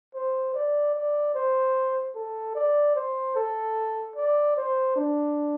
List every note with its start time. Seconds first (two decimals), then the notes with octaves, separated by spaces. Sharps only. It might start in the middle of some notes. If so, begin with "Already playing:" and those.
0.14 C5
0.55 D5
0.95 D5
1.35 C5
2.15 A4
2.55 D5
2.96 C5
3.36 A4
4.16 D5
4.56 C5
4.96 D4